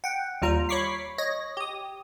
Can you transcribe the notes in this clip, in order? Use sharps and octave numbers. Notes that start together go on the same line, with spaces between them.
F#5 G5
D#2 G3 F4 A#5
C#5 B5 C#6 D6 B6 C7
C#5 D#5 A#6
G4 D#6